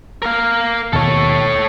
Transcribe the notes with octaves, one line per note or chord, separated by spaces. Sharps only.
A#4 F5
D#2 B2 D#3 A4 C#5